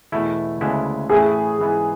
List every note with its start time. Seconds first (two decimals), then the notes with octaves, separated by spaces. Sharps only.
0.12 E2 B2 A3 E4
0.61 D2 C#3 G#3 B3 E4
1.10 A2 E3 A3 E4 G#4 B4
1.59 G#2 E3 B3